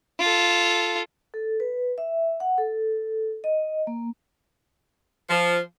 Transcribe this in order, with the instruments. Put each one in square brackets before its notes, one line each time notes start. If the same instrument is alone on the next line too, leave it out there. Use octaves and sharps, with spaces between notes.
[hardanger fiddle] F4 A4
[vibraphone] A4
B4
E5
F#5
A4
D#5
A#3
[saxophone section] F3